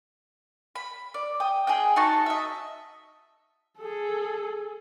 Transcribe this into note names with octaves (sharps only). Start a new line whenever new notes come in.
B5
D5
G5 D#6
G#4 D#5 G5
D#4 F#4 A5 C#6
D#5 E5
G#4 A4